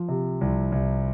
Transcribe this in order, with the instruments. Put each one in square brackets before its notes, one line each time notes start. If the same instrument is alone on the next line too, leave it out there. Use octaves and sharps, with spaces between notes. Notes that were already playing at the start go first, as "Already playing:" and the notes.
Already playing: [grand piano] F3
C3
C2
C2